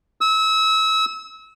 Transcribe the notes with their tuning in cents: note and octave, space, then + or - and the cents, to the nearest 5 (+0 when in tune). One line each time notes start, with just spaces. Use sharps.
E6 -30